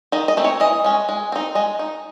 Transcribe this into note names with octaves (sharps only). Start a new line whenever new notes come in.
D#3 D#5
D#5
A3 C4 D#4
C#5
E3 D#5
G#3 C#4
G#3
C4 D#4
G#3 D#5
D#4